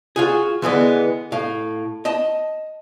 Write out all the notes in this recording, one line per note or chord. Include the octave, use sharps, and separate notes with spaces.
F4 F#4 G#4
D3 E3 G#3 B3
A2 F5
D#5 A5